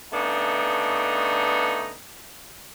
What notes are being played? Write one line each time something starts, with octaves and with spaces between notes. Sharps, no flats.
C#3 A3 B3 D4 D#4